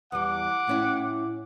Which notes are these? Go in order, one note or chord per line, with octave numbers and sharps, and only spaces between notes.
E2 G3 F#5 D6
A2 C#4 E4